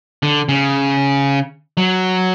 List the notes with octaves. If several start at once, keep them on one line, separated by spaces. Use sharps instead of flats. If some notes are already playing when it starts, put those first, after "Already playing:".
D3
C#3
F#3